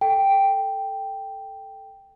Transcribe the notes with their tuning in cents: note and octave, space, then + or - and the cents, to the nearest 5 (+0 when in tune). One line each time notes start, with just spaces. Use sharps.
A4 +0 G5 +0